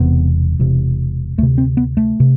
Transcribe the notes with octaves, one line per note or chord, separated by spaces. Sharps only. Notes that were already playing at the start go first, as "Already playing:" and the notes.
Already playing: E1 E2 C3 B3
E1 E2 C3
D2 C3 A3
C4
B3
A3
C3